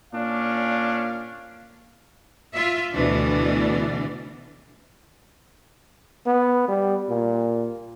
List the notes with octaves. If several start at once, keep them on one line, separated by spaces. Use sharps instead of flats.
A#2 C#4 D4 F5
F4 E5
D2 B2 E3 D4
B3
G3
A#2